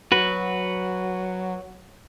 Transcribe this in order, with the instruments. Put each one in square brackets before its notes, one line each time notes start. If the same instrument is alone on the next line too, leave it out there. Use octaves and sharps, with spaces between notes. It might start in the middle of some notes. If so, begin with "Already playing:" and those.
[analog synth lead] F#3 [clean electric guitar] F#4 B4